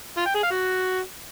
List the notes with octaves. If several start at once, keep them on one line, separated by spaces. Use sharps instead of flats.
F4
G5
G#4
F5
F#4